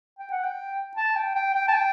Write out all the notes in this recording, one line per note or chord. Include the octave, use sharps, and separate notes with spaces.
G5
F#5
G5
A5
G5
G5
G5
A5
G5